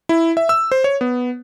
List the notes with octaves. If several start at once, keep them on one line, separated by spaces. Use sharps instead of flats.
E4
E5
E6
C5
C#5
B3